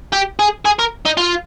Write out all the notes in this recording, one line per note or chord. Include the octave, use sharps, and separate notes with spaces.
G4
G#4
G#4
A#4
D#4
F4